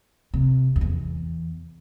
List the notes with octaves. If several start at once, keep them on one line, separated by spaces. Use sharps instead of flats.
C3
F2
E2